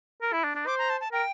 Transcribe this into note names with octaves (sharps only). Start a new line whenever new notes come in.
A#4
E4
D4
D4
C5 D6
A#5
A5
A5
A#4 G5